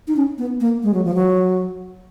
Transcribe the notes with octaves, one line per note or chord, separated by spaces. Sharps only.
D#4
C#4
B3
A#3
G#3
F#3
F3
F#3